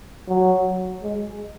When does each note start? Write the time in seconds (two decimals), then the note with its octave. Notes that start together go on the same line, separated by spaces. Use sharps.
0.28 F#3
1.03 G#3